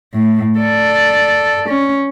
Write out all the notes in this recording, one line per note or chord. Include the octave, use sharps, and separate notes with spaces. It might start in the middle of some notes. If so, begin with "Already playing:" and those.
A2
A4 D5
C#4